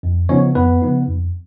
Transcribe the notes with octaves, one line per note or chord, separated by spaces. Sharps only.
F2
C#3 F3 B3 C#4 D#4 C#5
F2 B3 B4
C#3 F3 B3 D#4
F2